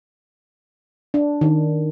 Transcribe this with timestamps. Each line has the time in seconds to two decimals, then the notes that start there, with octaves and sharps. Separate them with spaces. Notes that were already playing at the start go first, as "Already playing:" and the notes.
1.14 D4
1.41 D#3